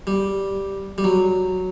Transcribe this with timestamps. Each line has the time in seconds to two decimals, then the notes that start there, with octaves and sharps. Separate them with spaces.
0.07 G3
0.98 G3
1.04 F#3